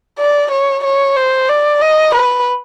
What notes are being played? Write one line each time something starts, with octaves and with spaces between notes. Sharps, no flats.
D5
C#5
C#5
C5
D5
D#5
B4